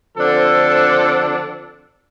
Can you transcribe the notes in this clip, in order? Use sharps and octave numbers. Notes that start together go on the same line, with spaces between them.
D3 F3 C4 D4 A4